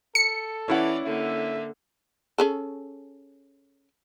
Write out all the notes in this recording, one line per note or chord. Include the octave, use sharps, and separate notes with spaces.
A4 C#7
E3 C#4 E4 D5 F#5
D3 A#3 E5
C#4 G#4 A4